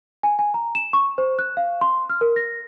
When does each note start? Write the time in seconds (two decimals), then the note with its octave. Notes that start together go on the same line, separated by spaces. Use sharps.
0.23 G#5
0.39 G#5
0.54 A#5
0.75 E7
0.93 C#6
1.18 C5
1.39 F#6
1.57 F5
1.81 C6
2.09 F6
2.21 A#4
2.36 A#6